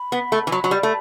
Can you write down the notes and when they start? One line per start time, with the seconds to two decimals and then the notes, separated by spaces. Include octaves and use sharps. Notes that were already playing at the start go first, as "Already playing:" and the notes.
Already playing: B5
0.12 B3
0.32 A3
0.47 E3
0.52 F#3
0.64 F#3
0.71 G3
0.83 A3